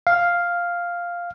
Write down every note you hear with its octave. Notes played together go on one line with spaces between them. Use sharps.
F5